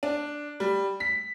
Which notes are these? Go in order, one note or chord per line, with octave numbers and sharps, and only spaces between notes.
D4
G3
B6